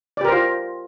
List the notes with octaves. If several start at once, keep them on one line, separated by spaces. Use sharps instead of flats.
F4 G4 A#4 C5 D5